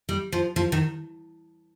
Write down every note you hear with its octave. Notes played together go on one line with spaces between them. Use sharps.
G3
F3
F3
D#3